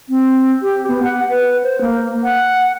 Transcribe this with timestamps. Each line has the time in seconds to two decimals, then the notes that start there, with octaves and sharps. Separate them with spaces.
0.09 C4
0.62 G4
0.88 B3
1.03 F#5
1.30 B4
1.63 C5
1.81 A#3
2.24 F#5